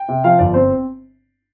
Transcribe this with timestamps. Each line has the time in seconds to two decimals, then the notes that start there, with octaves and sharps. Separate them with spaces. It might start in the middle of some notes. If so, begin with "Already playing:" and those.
Already playing: G5
0.08 C3
0.24 F3 F5
0.39 G1 D5
0.54 C4 C5